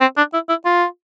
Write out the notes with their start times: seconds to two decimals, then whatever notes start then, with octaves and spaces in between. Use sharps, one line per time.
0.01 C4
0.17 D4
0.34 E4
0.49 E4
0.65 F4